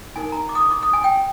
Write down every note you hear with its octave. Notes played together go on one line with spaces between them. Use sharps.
D#4 A#4 G#5
A#5
D6
D#6
D6
D6
D#6
G#5
G5